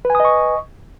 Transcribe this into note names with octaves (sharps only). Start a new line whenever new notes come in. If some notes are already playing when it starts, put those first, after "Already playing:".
B4 D#5 G#5 C#6 D#6